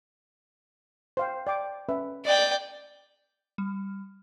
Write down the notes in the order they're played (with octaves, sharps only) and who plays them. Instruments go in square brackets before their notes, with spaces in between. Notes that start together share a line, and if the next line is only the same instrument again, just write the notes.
[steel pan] C5 F5 G5
D5 G5 D6
C#4 B4 E5
[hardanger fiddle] D5 G5 [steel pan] D#5
[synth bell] G3